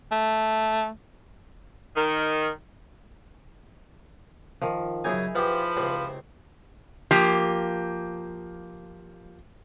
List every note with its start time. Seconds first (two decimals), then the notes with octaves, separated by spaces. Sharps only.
0.11 A3
1.96 D#3
4.61 D#3 F3
5.04 F#2 C#3 D#4 E4 G#4 G#5
5.35 F3 B3 G4 B4
5.77 C#2 C3
7.11 F3 A#3 G4